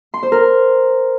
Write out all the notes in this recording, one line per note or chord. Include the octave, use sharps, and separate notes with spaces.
C6
C5
A#4